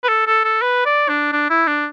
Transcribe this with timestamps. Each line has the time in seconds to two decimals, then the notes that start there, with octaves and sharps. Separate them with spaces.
0.03 B4
0.09 A4
0.27 A4
0.44 A4
0.62 B4
0.86 D5
1.09 D4
1.32 D4
1.50 E4
1.67 D4